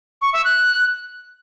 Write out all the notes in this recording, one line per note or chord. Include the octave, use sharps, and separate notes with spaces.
C#6
E5
F#6